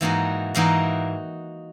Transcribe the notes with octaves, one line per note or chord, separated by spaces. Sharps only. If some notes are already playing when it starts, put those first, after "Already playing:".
G#2 E3 A#3 D#4 F#4
G#2 E3 A#3 D#4 F#4